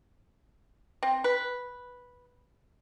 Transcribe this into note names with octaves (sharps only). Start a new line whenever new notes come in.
C4
B4